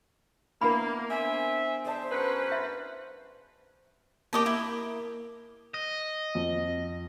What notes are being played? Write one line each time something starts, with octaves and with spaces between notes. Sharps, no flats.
A#3 B3 D4 E4 A#4 B5
C4 E5 G#5
G#4 C5 D5 A5
F#2 C#4 B4
E5
A#3 G4 D#5 A5 D6
E4
D#5
F2